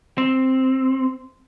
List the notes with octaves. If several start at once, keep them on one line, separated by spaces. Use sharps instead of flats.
C4